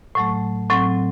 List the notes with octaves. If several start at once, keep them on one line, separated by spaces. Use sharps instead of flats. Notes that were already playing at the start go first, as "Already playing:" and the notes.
A2 F#3 A3
A2 F#3 C4